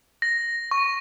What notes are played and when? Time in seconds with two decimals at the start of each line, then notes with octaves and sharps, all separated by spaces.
0.22 A#6
0.71 C#6